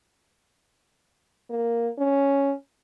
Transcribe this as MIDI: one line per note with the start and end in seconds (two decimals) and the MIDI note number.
1.50 1.88 58
1.99 2.53 61